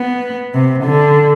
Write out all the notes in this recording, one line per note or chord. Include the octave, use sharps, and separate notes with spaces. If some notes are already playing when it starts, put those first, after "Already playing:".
Already playing: B3
C3
D3